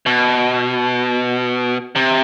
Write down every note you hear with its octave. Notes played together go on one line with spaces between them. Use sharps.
B2
C3